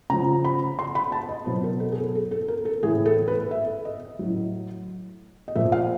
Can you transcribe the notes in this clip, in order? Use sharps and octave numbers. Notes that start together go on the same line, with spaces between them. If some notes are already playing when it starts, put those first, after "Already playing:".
C#3 F3 A#5
B5
C6
B5
A5
D#5
B2 F#3 C5
A#4
A4
G#4
A4
A4
A4
A#4
A4
A2 E3 G#4
A4
B4
E5
D#5
A2 F#3
D#5
A#2 F3 E5
F5